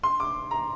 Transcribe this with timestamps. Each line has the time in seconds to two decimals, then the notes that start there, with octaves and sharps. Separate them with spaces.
0.03 C6
0.20 D6
0.51 A#5